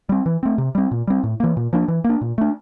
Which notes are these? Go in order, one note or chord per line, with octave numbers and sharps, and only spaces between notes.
G3 C4
E3
A3 C4
C3
G3 C4
A#2
G3 C4
A2
E3 A#3
A#2
F3 A#3 D4
E3
A#3 D4
A#2
A3 D4